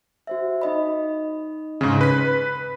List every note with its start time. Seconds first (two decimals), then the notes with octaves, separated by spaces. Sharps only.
0.27 F#4 C5 E5
0.62 D#4 D#5 B5
1.81 G#2 C#3
2.01 B4 B6